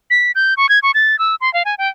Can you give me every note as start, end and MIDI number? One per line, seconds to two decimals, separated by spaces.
0.10 0.32 95
0.35 0.54 91
0.57 0.69 85
0.69 0.79 92
0.83 0.91 85
0.94 1.18 93
1.19 1.35 88
1.41 1.52 84
1.54 1.63 77
1.65 1.75 80
1.78 1.89 79